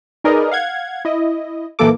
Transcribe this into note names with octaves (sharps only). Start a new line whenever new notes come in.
D#4 G#4 A#4 B4 D5 D#5
F5 F#5 G#6
E4 D#5
A#1 E3 F#3 A#3 A4 D6